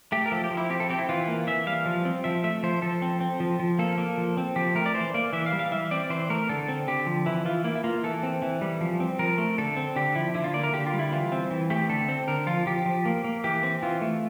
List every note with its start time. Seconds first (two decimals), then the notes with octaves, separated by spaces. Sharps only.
0.12 A3 G4
0.26 A#4
0.32 F3 A4
0.44 G4
0.51 F3
0.57 E4
0.70 C4 G4
0.80 A4
0.90 C4 G4
0.99 E4
1.09 E3 F4
1.28 A#3
1.47 E3 E5
1.67 G3 F5
1.86 F3
2.05 C4
2.24 F3 E5
2.44 A3 E5
2.63 F3 C5
2.82 F3 A4
3.02 C4
3.20 C4
3.40 F3
3.59 F3
3.79 A#3 A4
3.98 A#3
4.18 F3
4.37 C4
4.56 F3 G4
4.75 A3 A#4
4.86 D5
4.95 E3 C5
5.14 A#3 D5
5.33 E3 E5
5.46 F5
5.52 G3
5.59 F5
5.71 E3 E5
5.91 C4 D5
6.10 E3 C5
6.30 A3 A#4
6.49 D3 A4
6.68 C4
6.87 D3 G4
7.06 F3
7.26 E3 E4
7.45 E3 F4
7.64 A#3 E4
7.75 E4
7.84 A#3 F4
8.04 E3 A4
8.23 C4
8.42 E3
8.61 G3
8.81 F3
9.00 C4
9.19 F3 A#4
9.38 A3
9.58 D3 A4
9.77 C4
9.96 D3 G4
10.15 F3 E4
10.34 D3 E4
10.44 F4
10.54 A#3 D5
10.63 A#4
10.73 D3 G4
10.86 F4
10.93 G3
10.99 E4
11.12 E3 F4
11.32 C4
11.51 E3
11.70 A3 G4
11.89 D3 A4
12.09 C4
12.28 D3 A#4
12.47 F3 F4
12.66 F3 G4
12.86 F3
13.05 A#3
13.24 A#3
13.44 E3 G4
13.63 C4
13.83 E3 F4
14.01 A3